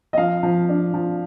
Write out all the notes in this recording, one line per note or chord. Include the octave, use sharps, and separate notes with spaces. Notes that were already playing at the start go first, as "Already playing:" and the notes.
D#5
F3 F5
F3
D4
F3